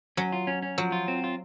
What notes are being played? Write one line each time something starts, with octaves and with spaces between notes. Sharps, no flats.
F#3 C#4
F4
C#4
C#4
F3 F#3
F4
C4
F4